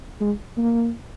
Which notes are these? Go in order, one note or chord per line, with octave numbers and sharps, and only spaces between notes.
G#3
A#3